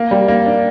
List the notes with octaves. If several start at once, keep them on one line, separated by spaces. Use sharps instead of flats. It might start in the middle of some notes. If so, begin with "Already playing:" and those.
Already playing: A#3
G3
A#3
D4